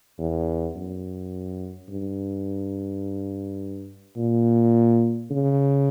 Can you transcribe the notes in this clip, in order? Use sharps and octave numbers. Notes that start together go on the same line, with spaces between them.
E2
F#2
G2
A#2
C#3